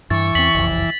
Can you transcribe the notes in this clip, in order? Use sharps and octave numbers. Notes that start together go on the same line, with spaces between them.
G2 E3 C#6 A6
E2 C4 B6 F#7
F#1 C2 F2